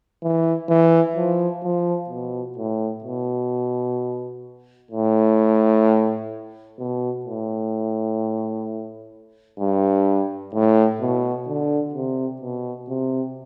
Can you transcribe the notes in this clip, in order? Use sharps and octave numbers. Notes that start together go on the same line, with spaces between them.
E3
E3
F3
F3
B2
A2
B2
A2
B2
A2
G2
A2
B2
D3
C3
B2
C3